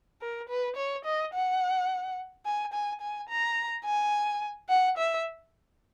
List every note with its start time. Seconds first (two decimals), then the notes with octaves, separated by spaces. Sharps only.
0.21 A#4
0.49 B4
0.76 C#5
1.05 D#5
1.33 F#5
2.46 G#5
2.73 G#5
3.01 G#5
3.29 A#5
3.85 G#5
4.69 F#5
4.97 E5